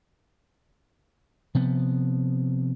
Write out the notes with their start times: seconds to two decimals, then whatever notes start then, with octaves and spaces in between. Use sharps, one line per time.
1.55 C3 F3 B3